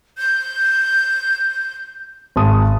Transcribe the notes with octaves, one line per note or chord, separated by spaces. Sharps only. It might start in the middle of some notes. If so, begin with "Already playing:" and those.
G6
G#1 A5 D#6